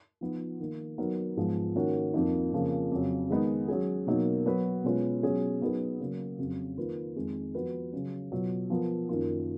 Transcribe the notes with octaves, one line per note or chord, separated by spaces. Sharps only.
F3 B3 D#4
D#3 A#3 D#4
F#3 B3 D#4 F#4 A#4
G#2 F3 G#3 B3
D#3 A#3 C#4 F#4 A#4
F2 F3 A#3 D#4
F2 C#3 F3 A#3
F2 C#3 F#3
D#3 G#3 B3 D#4
F#3 C#4 G#4
B2 F#3 A#3 D#4 A#4
F#3 B3 F#4 B4
B2 G#3 C#4 F4 B4
B2 F#3 C#4 G#4
F#3 B3 D#4 G#4 B4
C#3 F#3 A#3
F2 C#3 F#3
D#3 A#3 F4 B4
F2 D#3 G#3
F3 B3 F#4 B4
C#3 F#3 C#4
B2 F#3 B3 F4
F3 B3 F4 A#4
F#2 D#3 A#3 F4